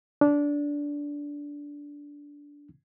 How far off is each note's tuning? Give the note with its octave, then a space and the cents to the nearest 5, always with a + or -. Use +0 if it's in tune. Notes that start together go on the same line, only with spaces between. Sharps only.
D4 -15